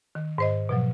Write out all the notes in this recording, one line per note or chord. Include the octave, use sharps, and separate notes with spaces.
D#3
G#2 C5 D#5
B2 F3 F#3